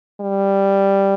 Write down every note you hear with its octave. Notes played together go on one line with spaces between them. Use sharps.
G3